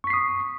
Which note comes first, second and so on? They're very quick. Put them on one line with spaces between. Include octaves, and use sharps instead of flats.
C#6 B6 C7 D#6